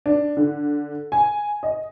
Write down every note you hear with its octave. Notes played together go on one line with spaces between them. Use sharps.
D4
D3
G#5
D#5